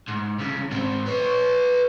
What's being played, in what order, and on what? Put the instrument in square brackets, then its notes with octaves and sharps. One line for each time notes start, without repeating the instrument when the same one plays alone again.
[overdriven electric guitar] G#2
C2 C#3
G#2 C4
B4 C#5